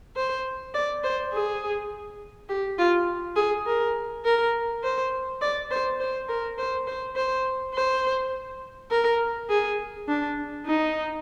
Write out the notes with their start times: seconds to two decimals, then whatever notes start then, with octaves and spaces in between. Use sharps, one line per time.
0.16 C5
0.74 D5
1.04 C5
1.33 G#4
2.49 G4
2.78 F4
3.36 G#4
3.67 A#4
4.25 A#4
4.83 C5
5.41 D5
5.71 C5
6.00 C5
6.29 A#4
6.58 C5
6.87 C5
7.16 C5
7.75 C5
8.91 A#4
9.50 G#4
10.08 D4
10.66 D#4